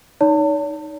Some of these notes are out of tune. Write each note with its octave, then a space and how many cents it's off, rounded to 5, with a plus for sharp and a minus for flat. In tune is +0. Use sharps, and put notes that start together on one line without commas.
D#4 -5 C#5 +45 A5 +35